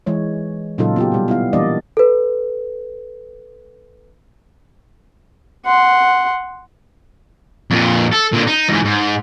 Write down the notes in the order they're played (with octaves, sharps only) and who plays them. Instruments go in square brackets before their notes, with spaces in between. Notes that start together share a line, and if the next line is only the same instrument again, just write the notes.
[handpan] E3 G#3 C#5
A#2 C#3 F#3 D#4 F4 A4
B3 F4 G4
B2 G3
B3 E4 F5
E3 G3 A#3 D4 D5 D#5
[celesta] A4 B4
[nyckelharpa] F#5 C6
[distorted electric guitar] F2 A#2
A4
A#2 D3
D#4
E2 G#2
G#2